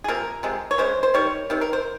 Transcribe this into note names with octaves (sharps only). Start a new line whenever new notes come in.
G#4
C3 F3 A#3 A#4
C3 F3 G#3
C#5
C#3 G#3 C5
C5
D#3 G3 C#5
C3 D#3
A#4
C5